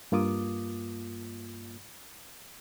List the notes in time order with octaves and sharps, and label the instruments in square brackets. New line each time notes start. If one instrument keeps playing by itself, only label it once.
[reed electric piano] G2 A#3 F4 D6 D#6